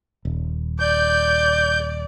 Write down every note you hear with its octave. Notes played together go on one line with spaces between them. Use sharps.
D#1
D5 G6